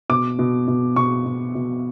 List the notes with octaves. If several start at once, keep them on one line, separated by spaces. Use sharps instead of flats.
B2 D6
B2
B2
B2 C#6
B2
B2